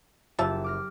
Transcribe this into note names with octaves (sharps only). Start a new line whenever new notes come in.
F#1 F4 G4 E5 A5 E7
D6 F6 A#6